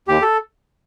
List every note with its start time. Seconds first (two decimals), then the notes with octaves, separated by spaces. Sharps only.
0.08 D#2 G4
0.22 A4